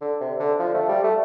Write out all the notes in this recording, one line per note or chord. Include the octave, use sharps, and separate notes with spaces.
D3
C3
D3
F3
A3
G3
A3